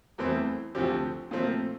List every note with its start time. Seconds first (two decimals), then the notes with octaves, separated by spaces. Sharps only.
0.18 E2 E3 A3 C4
0.75 D2 D3 F3 C4 G4
1.31 A#2 F3 A3 C4